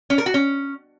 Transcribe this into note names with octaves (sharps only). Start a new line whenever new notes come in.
C#4
A#4
F#4
C#4